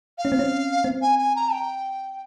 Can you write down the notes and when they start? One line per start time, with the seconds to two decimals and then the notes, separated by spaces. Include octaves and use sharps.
0.18 F5
0.25 C#4
0.32 C4
0.39 C#4
0.84 C4
1.02 G#5
1.18 G#5
1.35 A#5
1.52 G5